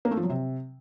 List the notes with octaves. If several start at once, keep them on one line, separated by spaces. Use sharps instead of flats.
A#3
A3
F3
F#3
C3